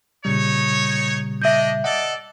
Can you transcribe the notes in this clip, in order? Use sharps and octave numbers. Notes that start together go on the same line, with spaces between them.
A#2 C#3 G3 D#4 C#5
D4 D#5 E5 G6
A4 D5 D#5 F#5